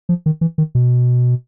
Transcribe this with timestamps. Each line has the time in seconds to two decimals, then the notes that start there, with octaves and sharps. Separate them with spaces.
0.09 F3
0.26 D#3
0.41 E3
0.58 D#3
0.75 B2